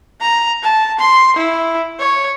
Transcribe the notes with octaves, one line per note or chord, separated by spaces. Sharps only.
A#5
A5
C6
E4
C#5